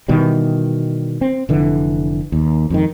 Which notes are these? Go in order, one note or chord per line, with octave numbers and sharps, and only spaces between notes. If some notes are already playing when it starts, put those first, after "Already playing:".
B2 D#3 E3 G3
C4
F1 D3 E3
D#2
F2 G#2 D#3